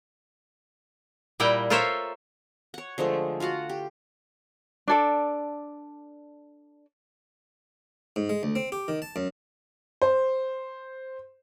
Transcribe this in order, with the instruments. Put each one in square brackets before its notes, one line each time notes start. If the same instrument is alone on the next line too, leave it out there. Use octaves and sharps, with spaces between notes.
[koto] A#2 G3 E4 A#4 G5
F4 A4 A#4 C5 C#5 E5
[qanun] C#5 F#5
D3 F3 G#3 A3
F4 F#4 F5 F#5
G4
[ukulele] D4 A4 D5
[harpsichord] G#2
G#3
D2
C4
G4
D#3
A5
F#2
[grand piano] C5